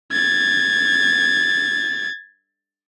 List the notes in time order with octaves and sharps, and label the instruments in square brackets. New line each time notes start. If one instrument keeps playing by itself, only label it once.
[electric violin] G#6 A6